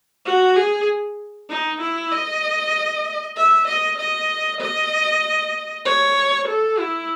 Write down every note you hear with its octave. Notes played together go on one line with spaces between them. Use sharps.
F#4
G#4
D#4
E4
D#5
E5
D#5
D#5
D#5
C#5
A4
E4